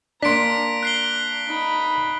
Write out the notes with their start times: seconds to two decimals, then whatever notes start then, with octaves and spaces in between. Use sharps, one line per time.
0.22 A#3 D4 D5 A#5 C6 B6 D7
0.83 F#6 C7 G7
1.48 D#4 B5